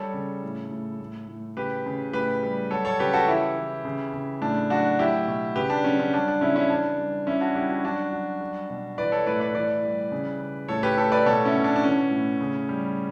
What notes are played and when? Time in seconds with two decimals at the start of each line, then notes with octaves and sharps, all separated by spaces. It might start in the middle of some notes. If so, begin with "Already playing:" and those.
Already playing: G3 A4 C#5
0.14 C#3
0.43 A2
0.71 A2
1.00 A2
1.28 A2
1.57 C#3 G4 B4
1.86 C#3
2.13 A2 G4 B4
2.43 G3
2.71 F#3 A4 C#5
2.85 A4 C#5
2.99 C#3 G4 B4
3.13 F#4 A4
3.28 E3 E4 G4
3.56 E3
3.85 C#3
4.13 C#3
4.42 A2 D4
4.70 F#3 D4 F#4
4.98 F#3 E4 G4
5.27 B2
5.56 C#3 G4 B4
5.70 D4
5.84 F#3 C#4
5.99 C#4
6.13 G3 D4
6.28 D4
6.41 C#3 C#4 E4
6.56 C#4 E4
6.70 E3 D4
6.98 G3
7.26 E3 C#4 E4
7.41 D4 F#4
7.55 G3 E4 G4
7.69 D4 F#4
7.84 F#3 D4 F#4
8.12 F#3
8.41 G3
8.70 B2
8.98 E3 B4 D5
9.12 A4 C#5
9.27 A2 B4 D5
9.40 B4 D5
9.55 E3 B4 D5
9.83 G3
10.12 C#3
10.41 C#3
10.68 A2 A4 C#5
10.83 G4 B4
10.97 A2 A4 C#5
11.12 B4 D5
11.26 B2 A4 C#5
11.45 C#4 E4
11.55 B2
11.64 D4
11.76 D4
11.84 E3 C#4
12.11 A2
12.41 C#3
12.69 G3